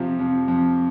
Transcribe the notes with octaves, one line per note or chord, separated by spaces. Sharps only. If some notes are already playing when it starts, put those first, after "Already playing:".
Already playing: F2 C3 F3
F2
F2